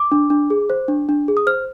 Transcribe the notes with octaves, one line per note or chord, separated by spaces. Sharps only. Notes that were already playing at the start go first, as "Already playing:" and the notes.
Already playing: D6
D4
D4
G#4
C5
D4
D4
G#4
D#6
C5 F6